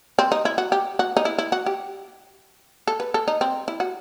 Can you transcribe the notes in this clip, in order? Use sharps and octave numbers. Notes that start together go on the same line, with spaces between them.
C4
D#4
E4
F#4
G4
F#4
D#4
E4
E4
F#4
G4
A4
B4
A4
D#4
C4
E4
F#4